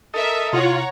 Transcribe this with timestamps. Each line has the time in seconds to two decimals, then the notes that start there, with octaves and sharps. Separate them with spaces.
0.14 A4 A#4 D#5 E5
0.53 C3 E4 F4 C#5 F#5 A#5